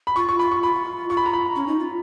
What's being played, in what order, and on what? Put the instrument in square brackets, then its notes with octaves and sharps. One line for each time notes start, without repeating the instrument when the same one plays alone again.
[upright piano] B5
[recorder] F4 [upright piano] C#6
[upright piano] C#6
[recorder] F4 [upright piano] B5
[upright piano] C#6
[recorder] F4 [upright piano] B5
[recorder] F4 [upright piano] C#6
[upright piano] B5
A#5
B5
[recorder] C#4
D#4
F4